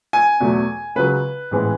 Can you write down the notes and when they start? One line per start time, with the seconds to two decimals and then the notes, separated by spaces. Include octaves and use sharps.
0.13 G#5
0.40 E2 B2 F#3 A3
0.95 C#2 C#3 F#3 B4
1.51 A1 G#2 E3 G#3 B3